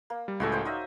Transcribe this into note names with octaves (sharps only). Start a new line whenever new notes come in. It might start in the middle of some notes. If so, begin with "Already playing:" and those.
A#3
G3
C#2 A2 F4 F#4 A4 G#5
C5 D5 G5
F#3 D#4 D#5 E5